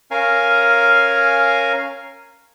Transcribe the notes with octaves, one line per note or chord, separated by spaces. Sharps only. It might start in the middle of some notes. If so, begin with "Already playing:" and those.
C#4 A#4 F5 G#5